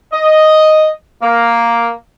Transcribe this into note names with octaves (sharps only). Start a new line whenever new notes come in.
D#5
A#3